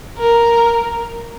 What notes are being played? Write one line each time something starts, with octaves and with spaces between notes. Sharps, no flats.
A#4